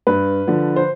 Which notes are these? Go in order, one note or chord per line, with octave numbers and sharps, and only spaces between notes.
G2 B4
D3 F3
C5